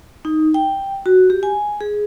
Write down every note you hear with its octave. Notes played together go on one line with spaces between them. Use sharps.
D#4
G5
F#4
G4
G#5
G#4